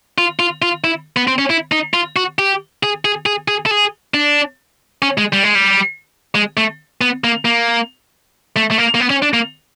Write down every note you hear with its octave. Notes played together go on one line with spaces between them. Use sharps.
F4
F4
F4
E4
B3
C4
C#4
E4
D#4
F4
F#4
G4
G#4
G#4
G#4
G#4
A4
G#4
D4
C#4
G#3
G3
G#3
G3
G#3
A3
B3
A#3
A#3
A3
A3
A#3
A#3
B3
C#4
D4
A#3